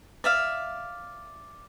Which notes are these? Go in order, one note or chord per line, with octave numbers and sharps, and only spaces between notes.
D5 E5 F5